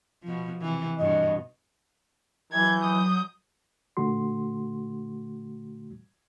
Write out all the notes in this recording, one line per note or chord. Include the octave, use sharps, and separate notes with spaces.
B2 F3
C3 E3
G2 B2 D#5
E3 F#3 G6 G#6
D#6
A#2 D3 A3 F#4 C6